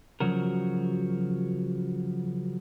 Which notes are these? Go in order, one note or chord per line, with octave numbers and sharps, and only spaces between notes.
C#3 F3 F#3 F#4 A#4